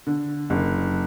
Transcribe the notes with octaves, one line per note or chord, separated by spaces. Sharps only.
D3
F#1